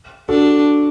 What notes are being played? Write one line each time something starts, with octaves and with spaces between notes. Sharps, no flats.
D4 F#4 A4